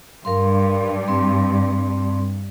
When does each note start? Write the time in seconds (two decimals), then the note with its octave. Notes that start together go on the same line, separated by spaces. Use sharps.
0.25 G2 A#4 F5 C6
1.08 C4 C6